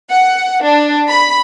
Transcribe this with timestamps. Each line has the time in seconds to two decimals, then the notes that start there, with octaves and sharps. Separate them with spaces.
0.11 F#5
0.64 D4
1.08 B5